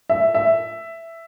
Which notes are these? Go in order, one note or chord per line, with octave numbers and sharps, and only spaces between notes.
E5
E5